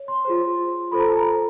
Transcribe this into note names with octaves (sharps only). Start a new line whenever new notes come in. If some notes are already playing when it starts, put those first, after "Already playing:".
Already playing: C#5
C6
F4 G#4 C5
F4 A4 C5 B5
A#5
A5
A#5